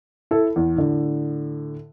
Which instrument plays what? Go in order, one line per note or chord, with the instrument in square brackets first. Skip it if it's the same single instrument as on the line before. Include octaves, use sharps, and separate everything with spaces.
[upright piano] E4 A4
E2
A2 D3